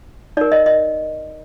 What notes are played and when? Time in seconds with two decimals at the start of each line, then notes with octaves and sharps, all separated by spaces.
0.37 D#4 A#4 D5
0.52 D#5
0.66 D#5